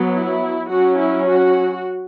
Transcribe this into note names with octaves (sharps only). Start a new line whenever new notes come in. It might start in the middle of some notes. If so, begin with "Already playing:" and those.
Already playing: F#3 B3
E4
F#3 C#4 F#4
E4
F#4